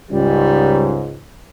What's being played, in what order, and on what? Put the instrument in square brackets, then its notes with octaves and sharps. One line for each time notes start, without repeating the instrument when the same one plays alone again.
[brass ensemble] C#2 G#2 [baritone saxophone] G3